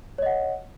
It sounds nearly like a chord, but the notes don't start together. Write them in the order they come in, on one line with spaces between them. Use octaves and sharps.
C#5 D#5 F#5